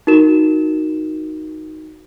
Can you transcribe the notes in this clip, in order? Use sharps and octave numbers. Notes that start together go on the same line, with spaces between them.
D#4 F#4 A#4 E7